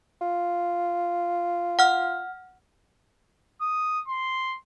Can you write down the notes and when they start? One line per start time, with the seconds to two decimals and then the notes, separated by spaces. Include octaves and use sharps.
0.22 F4
1.79 F#5 F6
3.61 D#6
4.08 C6